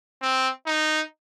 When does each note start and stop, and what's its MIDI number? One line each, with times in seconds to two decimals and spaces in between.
0.22 0.49 60
0.66 1.02 63